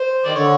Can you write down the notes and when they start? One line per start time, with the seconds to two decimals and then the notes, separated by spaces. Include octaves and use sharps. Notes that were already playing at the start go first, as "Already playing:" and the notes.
Already playing: C5
0.25 D#3 D5
0.35 D3 C#5